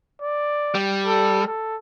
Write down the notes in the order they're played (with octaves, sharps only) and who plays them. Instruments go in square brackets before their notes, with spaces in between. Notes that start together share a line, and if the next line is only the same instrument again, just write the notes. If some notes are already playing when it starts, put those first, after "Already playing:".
[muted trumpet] D5
[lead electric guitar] G3
[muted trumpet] A4
A4